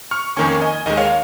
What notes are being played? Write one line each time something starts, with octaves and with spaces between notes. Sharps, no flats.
C#6 F6
F2 D#3 A#3 C#4 G#5 C#6
D#5 G#5
D#2 D#3 G#3 D#5
C#5 F5